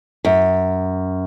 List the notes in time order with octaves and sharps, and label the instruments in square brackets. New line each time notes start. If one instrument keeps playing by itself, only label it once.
[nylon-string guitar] F#2